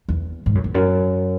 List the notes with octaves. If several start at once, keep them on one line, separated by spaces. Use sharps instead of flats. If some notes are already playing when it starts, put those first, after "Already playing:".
E2
G#2
F#2
E2
F#2